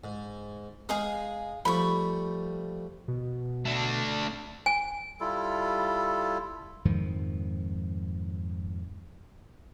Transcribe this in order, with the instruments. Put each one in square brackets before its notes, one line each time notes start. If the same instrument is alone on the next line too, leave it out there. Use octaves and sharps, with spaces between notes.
[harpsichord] G#2
[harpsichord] G#3 D#4 [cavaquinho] G#4 F5 D#6
[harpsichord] F3 G3 A3 [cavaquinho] B5 C#6
[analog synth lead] B2
[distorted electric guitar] A3 D4
[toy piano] G#5
[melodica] G3 E4 F4 A4
[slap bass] F2 G#2 D#3 F3